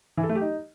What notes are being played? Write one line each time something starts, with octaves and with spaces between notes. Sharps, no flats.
E3
A4
A3
G4
D#4